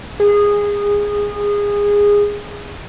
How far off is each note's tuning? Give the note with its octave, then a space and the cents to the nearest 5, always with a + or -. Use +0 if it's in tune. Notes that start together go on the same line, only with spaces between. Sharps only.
G#4 -20